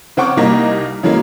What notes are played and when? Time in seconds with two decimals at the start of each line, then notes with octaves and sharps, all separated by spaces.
0.17 C#3 C4 F#5 G5 C#6 D6
0.37 C2 G3 A#3 D#4
1.03 C#3 E3 F#3 G#3 A#3